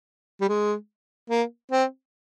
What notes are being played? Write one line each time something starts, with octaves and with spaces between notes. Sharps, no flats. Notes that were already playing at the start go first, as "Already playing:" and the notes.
G3
G#3
A#3
C4